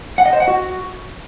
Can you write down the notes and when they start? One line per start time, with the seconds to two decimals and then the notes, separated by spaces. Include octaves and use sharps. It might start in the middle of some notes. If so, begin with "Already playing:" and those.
0.18 F#5
0.25 D#5
0.33 C5
0.40 F#5
0.48 F#4